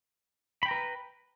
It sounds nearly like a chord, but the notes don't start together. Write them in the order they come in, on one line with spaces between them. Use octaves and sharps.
B5 G5 A#5 B4